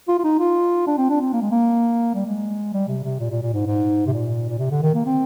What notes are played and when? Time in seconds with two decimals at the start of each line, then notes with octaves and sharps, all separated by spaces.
0.08 F4
0.19 F4
0.24 D#4
0.40 F4
0.87 D4
0.98 C4
1.10 D4
1.21 C4
1.33 A#3
1.42 G#3
1.52 A#3
2.15 G3
2.26 G#3
2.73 G3
2.88 C3
3.04 C3
3.20 A#2
3.31 A#2
3.42 A#2
3.54 G#2
3.66 G#2
4.07 C3
4.13 A#2
4.49 A#2
4.59 C3
4.72 D3
4.82 D#3
4.95 A#3
5.06 C4